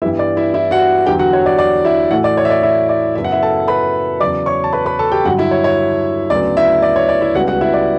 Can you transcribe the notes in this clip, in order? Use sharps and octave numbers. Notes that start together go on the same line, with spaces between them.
G2 E3 G3 B3 E4 E5
D5
E4 E5
E4 E5
F#4 F#5
E2 D3 F#3 G4 G5
F#4 F#5
C#5
D5
D5
E4 E5
A2 E3 A3 F#4 F#5
D5
C#5
E5
D5
E4 E5
D5
F#2 C#3 F#3 B3 E5
F#5
E4 E5
A4 A5
B4 B5
E2 C#3 F#3 D5 D6
C#5 C#6
A5
B4 B5
B4 B5
A4 A5
G4 G5
G2 D3 F#3 F#4 F#5
E4 E5
C#5
C#5
D2 C#3 F#3 B3 D5
E4 E5
D5
C#5
D5
E4 E5
C#2 C#3 G3 B3 F#4 F#5
F#4 F#5
E4 E5
D5